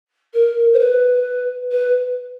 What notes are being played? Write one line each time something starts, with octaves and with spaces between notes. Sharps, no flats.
A#4
C5
B4
B4